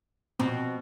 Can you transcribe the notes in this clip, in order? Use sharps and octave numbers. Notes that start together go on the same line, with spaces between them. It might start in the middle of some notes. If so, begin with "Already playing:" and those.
B2 C4